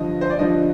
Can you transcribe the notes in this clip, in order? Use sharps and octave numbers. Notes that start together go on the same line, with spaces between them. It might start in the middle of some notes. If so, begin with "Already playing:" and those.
Already playing: G2 D3 F3 D#5
C5
D5
G2 D3 F3 D#5